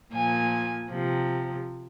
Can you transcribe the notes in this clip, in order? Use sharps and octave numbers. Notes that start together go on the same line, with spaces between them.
A#2 F3 G#5
C3 F3